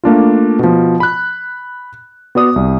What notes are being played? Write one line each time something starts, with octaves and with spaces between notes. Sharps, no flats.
A3 A#3 D4 F4
B2 F3
B5 F#6
B3 F#4 D5 D#6
C2